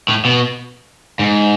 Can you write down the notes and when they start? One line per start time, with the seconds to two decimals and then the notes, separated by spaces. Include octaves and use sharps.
0.08 A2
0.25 B2
1.19 G#2